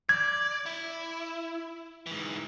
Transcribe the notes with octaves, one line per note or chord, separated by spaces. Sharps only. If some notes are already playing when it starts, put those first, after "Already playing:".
D5 G#6
E4
G#2 E3